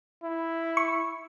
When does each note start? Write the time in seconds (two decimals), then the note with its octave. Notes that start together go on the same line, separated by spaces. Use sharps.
0.24 E4
0.77 C#6